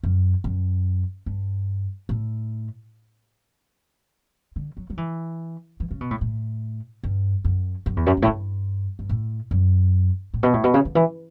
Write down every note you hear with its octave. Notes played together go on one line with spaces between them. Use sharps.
F#2
F#2
G2
A2
D3
F#3
F#3
E3
E3
C#3
B2
A2
A2
G2
F#2
F#2
E2
F#2
F#2
A2
G2
G2
A2
F#2
A2
B2
A2
B2
C#3
D3
E3